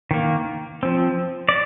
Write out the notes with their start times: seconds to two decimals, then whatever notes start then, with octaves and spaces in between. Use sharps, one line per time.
0.11 D#3 A#3
0.83 F3 C4
1.49 D5